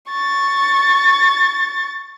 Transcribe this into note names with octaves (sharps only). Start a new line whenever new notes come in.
C#6 A6